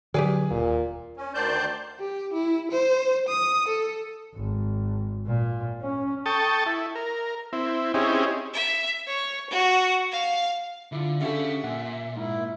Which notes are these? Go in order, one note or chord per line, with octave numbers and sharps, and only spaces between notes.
D3 D#3 F#3 G4 G#4 B4 D5
D#1 A#2
C#4
D2 D#3 C5 D5 A5 G6
G4
E4
C5
D#6
A4
G#1
A#2
C#4
A4 G5 A5 C#6 D#6
E4
A#4
C4 E4
C4 C#4 D#4 E4 G4 G#4
E5
C#5
F#4
F5
D3 E4 F4
D3 C#4 G4 A4 E5 F5
A#2 F#5 G#5
G#2 E4